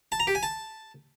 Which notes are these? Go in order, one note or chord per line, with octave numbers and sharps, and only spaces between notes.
A5
A#5
G4
G#5
A5